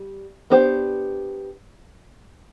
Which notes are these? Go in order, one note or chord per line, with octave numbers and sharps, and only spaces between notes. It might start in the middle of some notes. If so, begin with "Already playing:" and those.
Already playing: G3
B3 D4 G4 C5